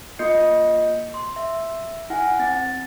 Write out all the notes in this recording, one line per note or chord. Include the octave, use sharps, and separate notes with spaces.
A#3 F4 D#5 G6 C7 C#7
C6
E5
E4 F#5 G#5
C4 A6